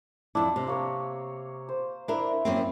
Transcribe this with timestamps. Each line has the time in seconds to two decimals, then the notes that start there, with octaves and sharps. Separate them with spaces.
0.35 F2 D4 E4
0.56 C3
0.68 A#3 C#5
1.69 C5
2.08 D4 E4 A#4
2.45 F#2 A#3 C4